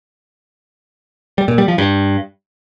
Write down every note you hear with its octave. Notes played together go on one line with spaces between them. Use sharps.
G3
A#2
G3
F3
G2